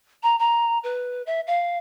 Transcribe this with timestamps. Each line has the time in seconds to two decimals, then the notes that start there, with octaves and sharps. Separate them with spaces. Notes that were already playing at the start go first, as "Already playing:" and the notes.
0.23 A#5
0.39 A#5
0.84 B4
1.26 E5
1.47 F5